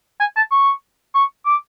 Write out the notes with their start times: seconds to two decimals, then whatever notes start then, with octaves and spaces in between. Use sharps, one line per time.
0.20 G#5
0.36 A5
0.52 C#6
1.14 C#6
1.46 D6